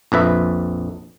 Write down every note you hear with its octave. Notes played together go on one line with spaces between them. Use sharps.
A#1 F2 B4 E5